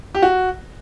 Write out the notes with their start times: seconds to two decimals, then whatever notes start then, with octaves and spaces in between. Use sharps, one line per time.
0.15 G4
0.22 F#4